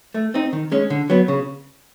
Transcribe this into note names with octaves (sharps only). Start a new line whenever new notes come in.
A3
C4 D#4
D#3
G#3 C#4
D3
F#3 B3
C#3